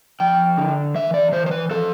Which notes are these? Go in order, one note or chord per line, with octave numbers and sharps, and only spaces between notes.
F3 G5
D3
E3 E5
D5
E3 C5
C5
B4
F3 A4